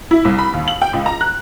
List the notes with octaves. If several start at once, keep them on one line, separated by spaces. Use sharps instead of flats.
E4
C2
B5
D#2
F#7
G5
C#2
A#5
F#6